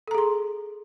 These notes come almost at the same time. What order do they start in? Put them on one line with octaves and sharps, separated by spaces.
A4 A#5 G#4 C6